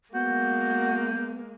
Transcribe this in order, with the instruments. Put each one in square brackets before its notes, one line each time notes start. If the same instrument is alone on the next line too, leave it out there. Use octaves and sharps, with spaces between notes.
[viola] G#3 A#3 [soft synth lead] B3 [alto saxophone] F#4 [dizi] G6